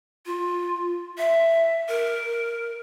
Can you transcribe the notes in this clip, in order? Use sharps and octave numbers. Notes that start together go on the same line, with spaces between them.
F4
E5
A#4